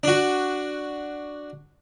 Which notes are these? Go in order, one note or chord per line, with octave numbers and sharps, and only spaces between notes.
D4 F#4